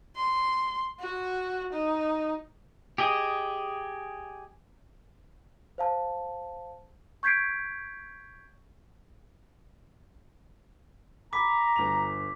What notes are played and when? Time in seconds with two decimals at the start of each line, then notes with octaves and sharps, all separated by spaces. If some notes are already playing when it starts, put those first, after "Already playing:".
0.16 C6
1.00 F#4
1.73 D#4
2.98 G4 G#4 D#5
5.78 C5 F5 A5
7.23 C#6 G6 G#6 B6 C7 D7
11.33 A#5 B5 D6 B6
11.76 G1 F7